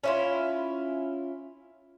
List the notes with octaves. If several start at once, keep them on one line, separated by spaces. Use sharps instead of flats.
C#4 E4 F4